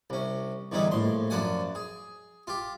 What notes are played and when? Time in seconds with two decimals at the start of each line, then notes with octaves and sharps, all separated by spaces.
0.10 C2 C#4
0.72 E2 D3 G3 C#4 D#4
0.91 A#1 A2 C6
1.30 F#2 F3 D5 F#5 G#5
1.75 G#4
2.47 F4 G4